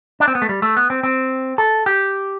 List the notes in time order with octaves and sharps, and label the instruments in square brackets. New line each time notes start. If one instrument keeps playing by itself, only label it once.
[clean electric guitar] D4
C4
B3
A3
G3
A3
B3
C4
C4
A4
G4